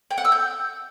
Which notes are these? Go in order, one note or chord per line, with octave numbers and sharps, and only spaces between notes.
G5
F#5
E6
G6